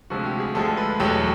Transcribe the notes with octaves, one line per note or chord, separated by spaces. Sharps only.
D2 C3 F3 G#3 F#4
G4
G#4
D2 D3 F3 G#3 A4
B4
E2 B2 F#3 A3 G4